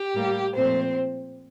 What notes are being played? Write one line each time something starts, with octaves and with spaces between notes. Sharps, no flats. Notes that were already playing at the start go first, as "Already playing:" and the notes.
Already playing: G4
A2 G3 A#3
A#2 F3 A3 C4 C5